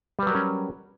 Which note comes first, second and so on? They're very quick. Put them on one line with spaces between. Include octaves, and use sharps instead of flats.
G3 B4 F#3 A#4 C#4